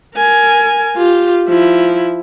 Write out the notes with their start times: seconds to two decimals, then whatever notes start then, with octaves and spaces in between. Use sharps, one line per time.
0.15 A#4 G#5
0.96 F4 G4
1.48 F3 E4